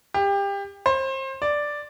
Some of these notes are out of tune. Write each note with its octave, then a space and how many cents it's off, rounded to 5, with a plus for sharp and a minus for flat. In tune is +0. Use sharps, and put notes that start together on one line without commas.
G4 +25
C5 +30
D5 +0